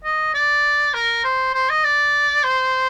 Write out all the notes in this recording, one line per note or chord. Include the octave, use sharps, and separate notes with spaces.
D#5
D5
A#4
C5
C5
D#5
D5
C5